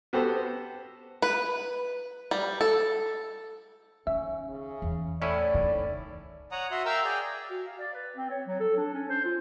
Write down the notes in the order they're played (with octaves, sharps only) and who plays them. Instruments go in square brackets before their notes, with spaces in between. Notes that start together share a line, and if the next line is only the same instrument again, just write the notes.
[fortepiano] B3 F#4 G4 A4 C5
[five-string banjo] B4
G3
A4
[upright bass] D#3 [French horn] C#4 [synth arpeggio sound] E5
[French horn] C#3
[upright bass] E2
[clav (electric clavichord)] A2 C#4 E4 [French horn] D5
[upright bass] D#3
[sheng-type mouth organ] C#5 F#5 A#5 D#6
F#4 E5 C6
A#4 E5 F5 G5 A#5 E6
G#4 D5 G5
[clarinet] F#4
F5
D5
B4
C4
C#5
F#3
A4
D4
C#4
C5
F4